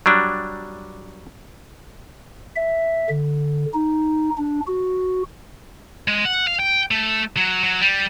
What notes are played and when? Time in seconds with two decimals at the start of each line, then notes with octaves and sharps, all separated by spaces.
0.06 F#3 G3 D4
2.56 E5
3.09 D3
3.74 D#4
4.37 D4
4.67 F#4
6.08 G#3
6.25 F#5
6.47 F5
6.60 G5
6.91 A3
7.37 F#3
7.64 F#3
7.81 G3